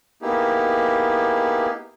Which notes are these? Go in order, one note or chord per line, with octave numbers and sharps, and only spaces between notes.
A#3 B3 D#4 E4 G4 G#4